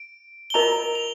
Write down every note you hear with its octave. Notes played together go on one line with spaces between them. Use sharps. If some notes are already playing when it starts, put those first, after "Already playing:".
Already playing: D7
G7
F4 A#4 D#5 A#5 F7
F7